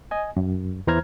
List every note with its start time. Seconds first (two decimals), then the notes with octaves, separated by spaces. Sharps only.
0.11 D#5 G#5
0.37 F#2
0.87 E2 E3 C5 A#5 F6 G#6